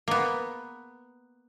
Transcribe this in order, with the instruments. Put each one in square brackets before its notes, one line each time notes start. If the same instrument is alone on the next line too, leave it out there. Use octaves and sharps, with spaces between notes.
[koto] A#3 B3